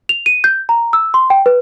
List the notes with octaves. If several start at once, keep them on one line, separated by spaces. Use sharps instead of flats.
F7
D#7
G6
A#5
E6
C6
G5
B4